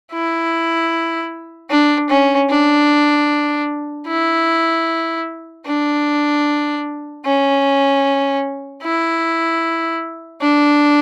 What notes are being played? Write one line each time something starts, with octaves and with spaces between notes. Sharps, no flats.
E4
D4
C#4
D4
E4
D4
C#4
E4
D4